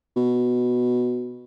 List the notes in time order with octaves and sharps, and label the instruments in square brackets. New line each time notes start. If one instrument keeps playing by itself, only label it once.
[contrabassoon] B2